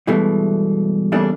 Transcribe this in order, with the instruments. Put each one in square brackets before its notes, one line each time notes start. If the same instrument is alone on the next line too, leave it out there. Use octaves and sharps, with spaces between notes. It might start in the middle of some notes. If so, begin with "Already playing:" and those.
[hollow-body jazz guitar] G2 B2 E3 G#3 A3
E2 C#3 G3 A3 A#3 D4